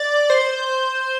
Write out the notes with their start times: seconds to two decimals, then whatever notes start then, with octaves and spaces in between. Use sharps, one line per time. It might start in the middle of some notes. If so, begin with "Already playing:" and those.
Already playing: D5
0.30 C5